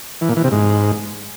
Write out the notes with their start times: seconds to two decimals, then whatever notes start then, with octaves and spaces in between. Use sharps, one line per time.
0.21 E3
0.29 A#2
0.36 E3
0.44 C3
0.52 G#2